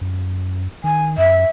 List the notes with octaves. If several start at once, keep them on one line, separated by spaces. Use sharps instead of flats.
F#2
D#3 G#5
F#2 E5